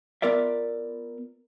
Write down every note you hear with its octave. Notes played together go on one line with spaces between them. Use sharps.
B3 F4 A#4 D5 E5